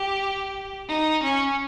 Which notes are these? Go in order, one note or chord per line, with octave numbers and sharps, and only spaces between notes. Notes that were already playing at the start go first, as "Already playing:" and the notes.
Already playing: G4
D#4
C#4